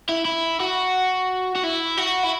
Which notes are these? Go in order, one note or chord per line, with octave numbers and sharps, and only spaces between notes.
E4
E4
F#4
F#4
E4
F#4
E4